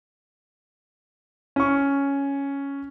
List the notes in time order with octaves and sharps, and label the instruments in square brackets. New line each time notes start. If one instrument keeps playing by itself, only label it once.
[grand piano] C#4 C#6